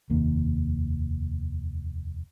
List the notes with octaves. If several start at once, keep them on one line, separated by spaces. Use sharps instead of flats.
F1 D#2 D#3 A#3